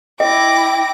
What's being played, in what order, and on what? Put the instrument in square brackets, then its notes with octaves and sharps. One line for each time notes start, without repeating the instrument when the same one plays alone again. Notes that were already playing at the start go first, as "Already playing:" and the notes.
[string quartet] E4 D6 A#6 [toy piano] D#5 [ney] G5